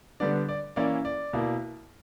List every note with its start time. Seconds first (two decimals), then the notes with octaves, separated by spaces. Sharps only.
0.20 D3 G3 B3 D4 D5
0.49 D5
0.76 E3 A#3 C#4 E4 D5
1.05 D5
1.33 B2 A#3 E4